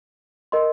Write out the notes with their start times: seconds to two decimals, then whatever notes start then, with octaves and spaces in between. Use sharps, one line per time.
0.52 A#4 D#5 C6